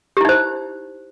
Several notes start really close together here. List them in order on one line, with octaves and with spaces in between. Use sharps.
G4 E4 D#4 C5